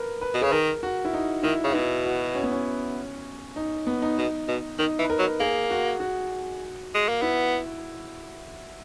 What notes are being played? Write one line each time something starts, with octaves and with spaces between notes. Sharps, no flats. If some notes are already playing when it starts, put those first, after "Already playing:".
Already playing: A#4 B4
B4
B2
C#3 G#4
D#3 A#4
F#4
E4
D#4
D#3 E4
C#3 F#4
B2 E4
F#4
C#4
B3
C#4
D#4
B3
D#4
B2
B2
D#3 D#4
E3
B4
A#4
F#3
A#3 G#4
F#4
F#4
G#3
A#3
B3 E4